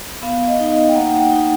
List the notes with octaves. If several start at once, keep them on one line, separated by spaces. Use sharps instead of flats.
B3 F5
D#5
D#4
D#5
G5
A#3 F#5
G5
D#4